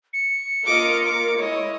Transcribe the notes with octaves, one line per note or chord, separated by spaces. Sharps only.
C#7
A#3 F4 A#4 D#5 D6
D6
G#3 E4 C#5 D#5